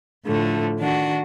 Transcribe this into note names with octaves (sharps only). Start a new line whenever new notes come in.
A2 D3 F3 A3
D#3 D4 F#4